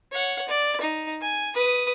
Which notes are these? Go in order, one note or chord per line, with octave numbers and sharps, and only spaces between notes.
C#5 F#5
D5
D#4
G#5
B4 D#6